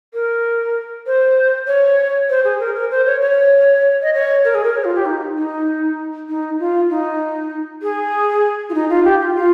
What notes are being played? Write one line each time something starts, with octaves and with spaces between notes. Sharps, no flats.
A#4
C5
C#5
C5
G#4
A#4
A#4
C5
C#5
C#5
D#5
C#5
A#4
G#4
A#4
C#5
F4
G4
D#4
D#4
D#4
F4
D#4
G#4
F4
D#4
F4
G4
F4
F4